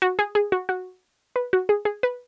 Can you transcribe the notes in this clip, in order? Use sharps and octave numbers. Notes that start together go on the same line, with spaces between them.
F#4
G#4
G#4
F#4
F#4
B4
F#4
G#4
G#4
B4